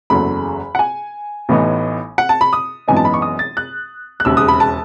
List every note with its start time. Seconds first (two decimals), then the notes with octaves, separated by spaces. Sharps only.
0.10 F#1 E2 C#3 F#3 A3 B5
0.75 F#5
0.79 G#5
1.49 A1 A2 E3 B3 D#4
2.18 F#5
2.29 A5
2.41 B5
2.53 D#6
2.88 G#1 F#2 E3 B3 D#4 G#5
2.97 A5
3.05 B5
3.14 C#6
3.22 D#6
3.39 A6
3.57 F#6
4.20 F#6
4.25 E1 D#2 C#3 E6
4.37 D#6
4.48 B5
4.60 A5